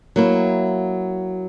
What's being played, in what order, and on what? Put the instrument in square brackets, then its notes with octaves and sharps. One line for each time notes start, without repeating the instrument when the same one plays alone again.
[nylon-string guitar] F#3 A#3 E4